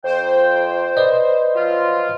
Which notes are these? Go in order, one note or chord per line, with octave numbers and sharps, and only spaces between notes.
F2 C5 G5
B4 D5 D#5
F3 F#3 F4